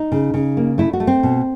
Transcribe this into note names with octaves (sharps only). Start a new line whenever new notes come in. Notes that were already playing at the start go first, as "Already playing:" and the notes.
Already playing: D#4
C#3
C#3
A#3
A3 E4
F#4
A3
C4
B2